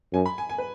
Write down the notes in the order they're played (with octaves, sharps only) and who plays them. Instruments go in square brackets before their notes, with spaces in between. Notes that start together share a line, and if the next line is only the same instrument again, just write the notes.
[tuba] F#2 [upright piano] G#5
[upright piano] B5
G#5
G#5
B4